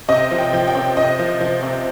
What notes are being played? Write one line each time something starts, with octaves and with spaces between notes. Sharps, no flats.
C3 D#5
F3
G5
F3
G5
C3
C3 D#5
F3
F3
C3